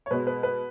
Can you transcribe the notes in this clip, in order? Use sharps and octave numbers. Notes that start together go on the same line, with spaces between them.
C#5
B2 G#3 B4
B4
B4